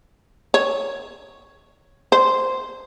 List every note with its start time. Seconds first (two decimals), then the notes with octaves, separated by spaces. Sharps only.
0.54 C#5
2.12 C5